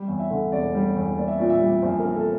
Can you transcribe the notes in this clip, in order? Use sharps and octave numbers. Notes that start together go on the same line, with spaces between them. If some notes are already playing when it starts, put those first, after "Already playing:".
Already playing: G3
E2
E5
D3
E1 D5
G3
E2
A#3 D5
E5
A#2 D5
E5
G3
A#1 C5
A#4
A#3
A4